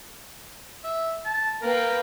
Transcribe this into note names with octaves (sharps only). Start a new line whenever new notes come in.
E5
A5
A#3 A#4 B4 G5